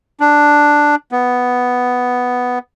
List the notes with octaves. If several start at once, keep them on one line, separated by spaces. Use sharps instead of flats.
D4
B3